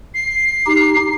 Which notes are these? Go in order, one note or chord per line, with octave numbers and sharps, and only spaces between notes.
C7
D#4 G4